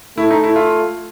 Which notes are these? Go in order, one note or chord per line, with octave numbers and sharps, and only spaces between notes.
A3 E4
D#4
E4
F4